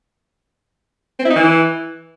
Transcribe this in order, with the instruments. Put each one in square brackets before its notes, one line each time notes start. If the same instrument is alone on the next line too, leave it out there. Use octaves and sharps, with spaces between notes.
[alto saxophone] C4
E4
D#4
E3